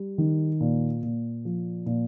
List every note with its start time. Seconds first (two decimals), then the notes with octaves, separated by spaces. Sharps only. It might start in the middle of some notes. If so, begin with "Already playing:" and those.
Already playing: G3
0.18 D#3
0.60 A#2
1.03 A#2
1.45 F3
1.86 A#2